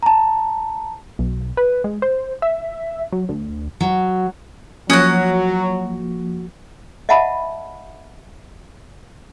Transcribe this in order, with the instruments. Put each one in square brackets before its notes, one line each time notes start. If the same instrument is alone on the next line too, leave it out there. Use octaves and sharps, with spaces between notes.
[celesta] A5 A#5
[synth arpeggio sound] B1
B4
G#3
C5
E5
F#3
D2
[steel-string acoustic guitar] F#3
[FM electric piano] F3 A#3 [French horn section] F#3 [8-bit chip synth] C#4 D#6 G#6 [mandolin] F#4 F#6
[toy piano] D#5 E5 F#5 A5 B5